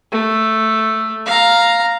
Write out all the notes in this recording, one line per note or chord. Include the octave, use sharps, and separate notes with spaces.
A3
F5 A#5